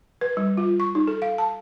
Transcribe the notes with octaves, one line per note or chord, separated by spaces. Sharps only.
B4
G3
F4
C#6
D#4
A4
F5
A5